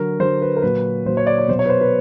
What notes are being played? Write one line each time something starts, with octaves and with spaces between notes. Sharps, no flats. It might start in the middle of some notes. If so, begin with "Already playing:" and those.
Already playing: D3 F#3 A#4
D3 F#3 C5
B4
A#4
A#2 F#3 B4
A#2 F#3 C5
C#5
D5
C#5
B2 F#3 C5
C#5
B4
C5
B4